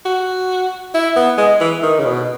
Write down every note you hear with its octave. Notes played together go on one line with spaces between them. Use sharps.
F#4
E4
B3
G#3
E3
D#3
C#3
B2